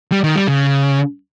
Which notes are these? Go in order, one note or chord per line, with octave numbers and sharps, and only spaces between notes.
G3
D#3
G3
C#3